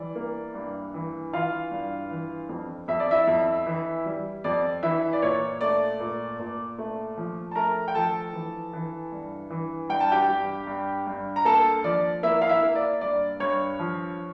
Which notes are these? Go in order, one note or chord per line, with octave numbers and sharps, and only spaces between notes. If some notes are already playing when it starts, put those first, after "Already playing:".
Already playing: E3 G3 D5
A#3
G2
E3
E3 F4 F5
G2
E3
F2
F2 E5
D5
E4 E5
F2
E3
G3
F2 D5
E3 E4 E5
D5
A#2 C#5
A3 D5
A#2
A#2
A3
F3
A5
A3 A#4 A#5
G5
F3 A4 A5
E3
E3
G2
E3
G2 G5
A5
G4 G5
G2
G2
G2
A#5
A#3 A4 A5
F3 D5
A#3 E4 E5
F5
E4 E5
A#3
D5
G2 D5
G2 C#5
F3